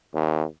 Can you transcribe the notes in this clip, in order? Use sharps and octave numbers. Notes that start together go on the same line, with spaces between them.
D#2